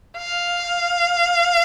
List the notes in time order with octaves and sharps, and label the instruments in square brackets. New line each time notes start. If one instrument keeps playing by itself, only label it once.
[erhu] F5